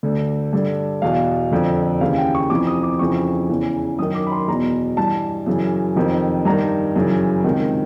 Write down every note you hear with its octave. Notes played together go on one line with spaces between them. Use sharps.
D2 D3
G2 D3
E2 B2 F5
F2 D3
D#2 C#3 E3 F5
G5
C#6
F2 C3 E3 D6
D#6
D6
F2 C#3 E3 C#6
E2 C#3 E3
F#2 D#3 D#6
D6
B5
C6
E2 B2 A#5
G2 E3 A5
F#2 C#3 E3
F2 C3 D#3
G2 D#3 A#5
F#2 C#3 E3
C#2 C3 D#3